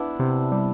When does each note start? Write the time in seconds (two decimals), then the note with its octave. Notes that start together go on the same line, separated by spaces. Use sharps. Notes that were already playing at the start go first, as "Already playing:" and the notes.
Already playing: B3 D4 E4
0.19 C3
0.52 G3